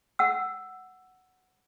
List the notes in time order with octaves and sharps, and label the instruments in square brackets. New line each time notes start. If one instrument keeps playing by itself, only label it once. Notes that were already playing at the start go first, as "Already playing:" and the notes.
[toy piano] F#5 E6